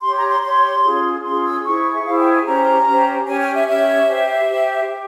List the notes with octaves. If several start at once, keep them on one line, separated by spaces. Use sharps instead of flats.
G4 C#5 C6
A#5
C6
G4 C#5 C6
C#4 F4 G#4
C#4 F4 G#4 C6
E6
E4 G#4 C5 C#6
E5
E4 G#4 C5 F5
G5
G#5
C#4 G4 C5 A#5
C#4 G4 C5
C#4 G4 C#5 G#5
G#5
E5
C#4 G4 C#5 E5
G4 C5
G4 C5
G4